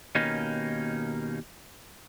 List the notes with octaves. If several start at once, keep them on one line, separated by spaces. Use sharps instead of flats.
D#2 B2 A#3 C#4 D#4